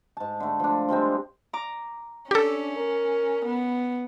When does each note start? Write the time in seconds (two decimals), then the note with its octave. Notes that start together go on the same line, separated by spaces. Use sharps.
0.17 G#2 A5
0.40 D3 A3
0.60 F3 D4
0.88 F3 G3 G#3 C4
1.53 A#5 D6
2.31 C#4 D4 G4 A4
2.76 A#4
3.45 B3